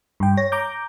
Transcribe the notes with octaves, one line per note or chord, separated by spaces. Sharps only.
G2 G5
C#5 A#6
A#5 D6 G6